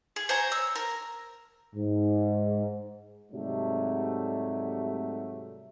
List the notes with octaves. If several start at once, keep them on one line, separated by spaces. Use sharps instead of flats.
G#4
C5 C#5 G#5 A#5
E6
A#4
G#2
G#2 C3 F#3 G3 A3